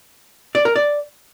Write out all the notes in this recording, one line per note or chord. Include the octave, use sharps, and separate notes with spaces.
D5
A#4
D5